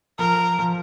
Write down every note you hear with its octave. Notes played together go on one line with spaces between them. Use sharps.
F3 A#4
F3